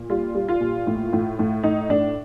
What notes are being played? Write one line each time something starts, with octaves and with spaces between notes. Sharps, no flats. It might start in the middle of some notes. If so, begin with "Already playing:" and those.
Already playing: A#2
G3 F4
G3
F4
A#2
A2
A2
A2
A2 D#4
A2 D4